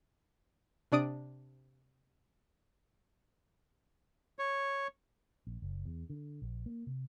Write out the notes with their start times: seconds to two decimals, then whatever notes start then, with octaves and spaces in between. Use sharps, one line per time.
0.92 C3 D4 D5 D#6 D7
4.39 C#5
5.47 A#1
5.62 F#1
5.85 E2
6.10 D3
6.42 A#1
6.66 A#3
6.87 C3